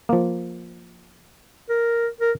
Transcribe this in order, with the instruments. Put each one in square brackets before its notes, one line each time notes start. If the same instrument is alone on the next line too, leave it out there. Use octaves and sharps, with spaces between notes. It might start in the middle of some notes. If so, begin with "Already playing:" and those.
[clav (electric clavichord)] F3 A#3
[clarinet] A#4
A#4